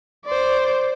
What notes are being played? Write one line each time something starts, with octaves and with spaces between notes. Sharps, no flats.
C5 D5